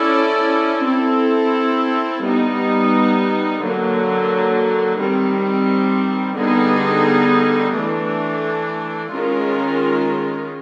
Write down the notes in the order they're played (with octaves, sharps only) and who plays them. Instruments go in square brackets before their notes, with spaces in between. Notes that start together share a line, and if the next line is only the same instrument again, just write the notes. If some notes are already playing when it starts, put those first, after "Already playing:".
Already playing: [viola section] C#4 E4 A4 D5
C4 E4 A4
G3 B3 D#4
D3 F#3 A#3
D#3 G3 C4
D3 G3 B3 D#4 G#4
E3 A3 D4
D#3 G#3 C#4 F4 A#4